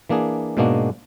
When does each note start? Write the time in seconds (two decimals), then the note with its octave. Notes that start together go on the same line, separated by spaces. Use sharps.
0.09 E3 A#3 D4 G#4
0.57 G#2 B2 G#3 A#3 D4 F#4